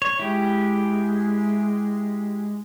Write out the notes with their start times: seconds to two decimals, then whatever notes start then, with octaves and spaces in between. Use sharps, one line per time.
0.02 C#5
0.19 G#3 E4 G4